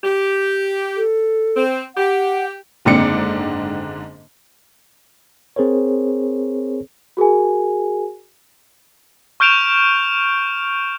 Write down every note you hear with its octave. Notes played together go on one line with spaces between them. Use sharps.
G4
A4
C4
G4 F#5
F#1 G#2 D3 C4 D5 C#7
C4 G#4 A#4 C5 C#5
F#4 G#4 A#4 G#5
C#6 F6 G6 D7 E7 F7